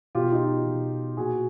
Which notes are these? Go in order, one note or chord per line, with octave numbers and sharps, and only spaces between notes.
B2 F4 G4
D#4 F4
B2
A#2 F#4 G#4